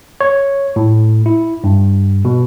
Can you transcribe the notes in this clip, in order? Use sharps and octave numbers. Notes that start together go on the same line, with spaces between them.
C#5
A2
E4
G2
B2